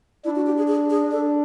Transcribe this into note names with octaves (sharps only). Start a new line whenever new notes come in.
D4 E4
F#4
G4
G#4
G#4
G#4
D4 A4